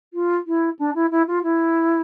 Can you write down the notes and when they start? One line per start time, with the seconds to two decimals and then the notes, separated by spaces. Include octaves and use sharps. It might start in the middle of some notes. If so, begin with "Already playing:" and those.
0.13 F4
0.46 E4
0.79 D4
0.94 E4
1.11 E4
1.27 F4
1.43 E4